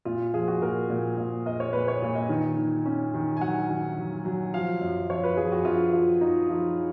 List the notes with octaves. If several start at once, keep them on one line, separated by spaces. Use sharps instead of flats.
A#2 F4
F3 G#4
F#4
A#2 A#4
A#2
A#2
A#3 D#5
C#5
A#2 B4
C#5
A#2
D#5
D#3
D#3
C#4
D#3
G#5
F#3 F#5
D#3
F#3
F#3
F3 F5
F#2
F3 C#5
B4
F3 G#4
F#4
F3 F4
F3
D#4
F3